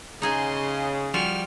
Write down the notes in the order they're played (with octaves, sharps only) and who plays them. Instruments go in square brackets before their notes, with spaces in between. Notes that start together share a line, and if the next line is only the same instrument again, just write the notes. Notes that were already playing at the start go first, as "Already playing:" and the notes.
[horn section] C#3 [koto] D#4 G#4 G#5 [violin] D#5 C6
[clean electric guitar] F3 G3 F#4 [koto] F4 [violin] G5 F6